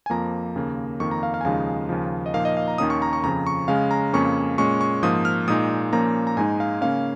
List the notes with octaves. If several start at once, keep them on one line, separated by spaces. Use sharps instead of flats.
G#5
F2 F3 A#3 A#5
D#2 C#3 A#3
F2 D#3 A#3 C#6
A#5
F5
F5
G#5
D#2 C#3 F3 G#3 D#4 F5
D#2 C#3 F3
D#5
A#2 F3 A#3 D#4 F5
D#5
F5
A#5
D#2 D#3 A#3 C#4 D#6
C#6
A#5
C#6
F2 C#3 F3 A#5
C#6
C#3 G#3 C#4 F5
A#5
F2 C#3 A#3 C#4 C#6
A#2 G#3 C#4 C#6
C#6
G#2 F3 A#3 D#6
F6
A#2 G#3 D#4 D#6
A#2 F3 A#3 C#4 A#5
A#5
G#2 G#3 D#4 G#5
F5
C#3 A#3 C#4 F5